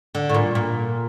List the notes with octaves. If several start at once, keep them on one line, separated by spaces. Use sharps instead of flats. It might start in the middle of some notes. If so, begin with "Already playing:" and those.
D3
A2
A#2
A#2